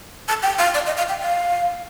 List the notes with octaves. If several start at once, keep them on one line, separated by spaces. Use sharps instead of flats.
A5
G5
F5
D5
D#5
F5
G5
F5